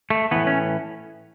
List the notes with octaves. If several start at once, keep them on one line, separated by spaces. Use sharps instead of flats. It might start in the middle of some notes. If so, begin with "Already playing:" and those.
A3
A2 E3 B3
C#4